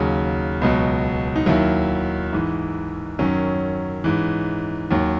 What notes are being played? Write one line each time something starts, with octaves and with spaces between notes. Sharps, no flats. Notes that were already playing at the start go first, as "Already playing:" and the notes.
Already playing: D#2 C#3 F#3
C#2 B2 F#3
D#4
D#2 D#3 F#3 E4
G#2 E3
F#2 D#3 F#3 C#4
G#2 E3
D#2 D#3 F#3